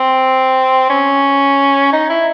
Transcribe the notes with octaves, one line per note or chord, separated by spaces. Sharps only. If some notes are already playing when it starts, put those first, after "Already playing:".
Already playing: C4
C#4
D#4
E4